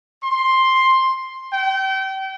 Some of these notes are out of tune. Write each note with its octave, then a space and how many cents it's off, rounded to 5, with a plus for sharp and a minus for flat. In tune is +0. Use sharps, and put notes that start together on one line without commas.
C6 +10
G5 -35